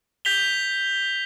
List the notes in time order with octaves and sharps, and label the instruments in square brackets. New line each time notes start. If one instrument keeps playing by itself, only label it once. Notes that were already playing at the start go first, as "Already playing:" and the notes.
[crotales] G6 B6 F7 G7